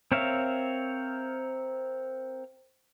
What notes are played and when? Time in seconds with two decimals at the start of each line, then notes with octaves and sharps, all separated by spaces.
0.12 C4 A#4 C#5 E5 F5